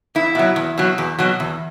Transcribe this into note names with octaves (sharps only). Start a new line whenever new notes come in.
E2 E4
B2 F#3
E2
B2 F#3
E2
B2 F#3
E2